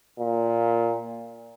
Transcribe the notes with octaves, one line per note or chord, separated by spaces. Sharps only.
A#2